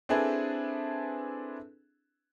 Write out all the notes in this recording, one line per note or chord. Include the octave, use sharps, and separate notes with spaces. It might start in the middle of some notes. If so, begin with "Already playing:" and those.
C4 D4 E4 G#4 A4 B4